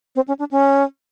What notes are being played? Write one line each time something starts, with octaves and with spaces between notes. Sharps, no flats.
C4
C#4
D4
C#4